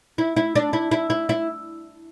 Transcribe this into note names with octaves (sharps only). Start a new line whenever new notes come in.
E4
E4
D4
E4
E4
E4
E4